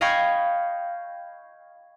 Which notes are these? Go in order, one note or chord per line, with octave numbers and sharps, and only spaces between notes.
D#5 F5 G5 B5 C#6 G#6